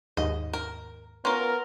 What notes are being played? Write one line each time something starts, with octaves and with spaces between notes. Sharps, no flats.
D#2 G#2 D#5
A#4
B3 C#4 F4 A#4 C6